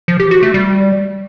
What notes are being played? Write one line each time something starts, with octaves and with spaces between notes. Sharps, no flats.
F3
G4
F#4
A3
G3